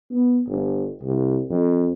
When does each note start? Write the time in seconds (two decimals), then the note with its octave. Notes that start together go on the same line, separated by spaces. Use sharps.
0.11 B3
0.48 G1
1.03 C2
1.50 F2